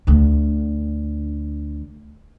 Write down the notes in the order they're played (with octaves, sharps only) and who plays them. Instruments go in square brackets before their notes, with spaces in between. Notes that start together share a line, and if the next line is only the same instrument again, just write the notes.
[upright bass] D2 D3